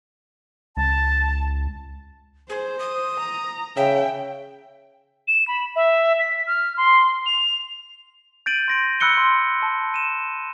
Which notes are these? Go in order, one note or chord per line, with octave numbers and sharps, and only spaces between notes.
C#2 A5
G#4 C5
D#6
A#5
C#3 E5 G5
E7
B5
E5
B6
F6
C6
F7
G6 A6 D7 D#7 F#7
C6 A#6 D7
B5 E6 F#6 C#7 G7
C6
A5 E6
D#7 E7